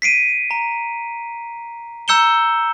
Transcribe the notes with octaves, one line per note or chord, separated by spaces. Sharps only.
B6 C7 D7 D#7
A#5
A#5 E6 G6 C#7 E7 G7